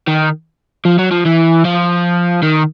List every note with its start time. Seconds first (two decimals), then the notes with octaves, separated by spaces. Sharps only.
0.07 D#3
0.85 F3
0.99 F#3
1.11 F3
1.25 E3
1.65 F3
2.43 D#3